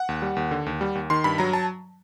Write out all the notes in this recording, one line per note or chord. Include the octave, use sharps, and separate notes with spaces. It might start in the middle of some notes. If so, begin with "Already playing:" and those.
Already playing: F#5
D#2
G3
D#2
D3
D#2
G3
D#2
D#3 C6
G2 B5
F#3 A#5
A5